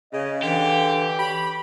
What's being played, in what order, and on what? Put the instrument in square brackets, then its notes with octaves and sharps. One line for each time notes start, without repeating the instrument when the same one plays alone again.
[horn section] C#3 [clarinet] D#5
[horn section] D3 F5 [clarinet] E3 [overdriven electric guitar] G4
[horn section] G4 C#5 B5